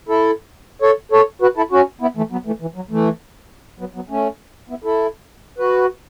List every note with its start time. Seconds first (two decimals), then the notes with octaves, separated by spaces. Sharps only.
0.09 E4 A4
0.82 A4 C#5
1.12 A4 C#5
1.42 F#4 B4
1.57 E4 A4
1.72 C#4 F#4
2.01 B3 E4
2.17 E3 A3
2.31 F#3 B3
2.46 E3 A3
2.61 E3
2.76 F#3
2.91 E3 A3
3.80 F#3 B3
3.95 F#3 B3
4.10 A3 C#4
4.69 B3 E4
4.84 E4 A4
5.58 F#4 B4